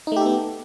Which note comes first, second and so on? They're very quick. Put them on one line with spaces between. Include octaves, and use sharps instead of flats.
D#4 A3 G4 A4 B3